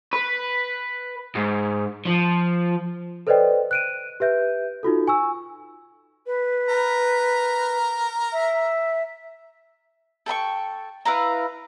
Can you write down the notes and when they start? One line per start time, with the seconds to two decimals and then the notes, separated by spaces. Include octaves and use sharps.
0.13 B4
1.35 G#2
2.06 F3
3.27 A4 B4 C5 D5 D#5 G5
3.71 F#6 D7 D#7
4.20 G4 B4 E5 G6
4.83 D#4 F4 F#4 A4
5.08 G#5 C#6 E6
6.26 B4
6.69 A#4 A#5
8.32 E5
10.26 A4 G5 B5 C#6
11.05 E4 B4 F5 A#5